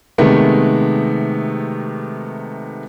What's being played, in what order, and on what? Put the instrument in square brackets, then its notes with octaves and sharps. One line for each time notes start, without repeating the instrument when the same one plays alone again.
[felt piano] C3 D#3 G#3 A3 B3